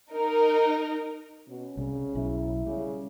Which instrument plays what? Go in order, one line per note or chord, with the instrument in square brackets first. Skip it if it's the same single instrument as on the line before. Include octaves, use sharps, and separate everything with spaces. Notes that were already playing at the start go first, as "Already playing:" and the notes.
[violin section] D#4 A#4
[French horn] B2 [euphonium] C#4
[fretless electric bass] C2 [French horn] C#3
[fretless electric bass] B1 [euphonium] E4
[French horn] C#3 [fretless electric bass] G3